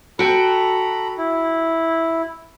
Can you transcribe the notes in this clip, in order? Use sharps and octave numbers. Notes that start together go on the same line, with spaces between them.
F#4 A4 G5 A#5 B5
E4